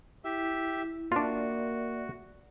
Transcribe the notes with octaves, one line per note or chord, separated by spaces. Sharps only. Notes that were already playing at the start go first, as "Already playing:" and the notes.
E4 G4 E5
A#3 D4 F4 F#4 D5 E5